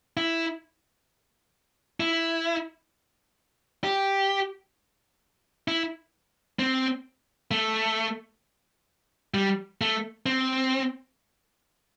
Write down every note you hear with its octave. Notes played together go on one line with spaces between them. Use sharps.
E4
E4
G4
E4
C4
A3
G3
A3
C4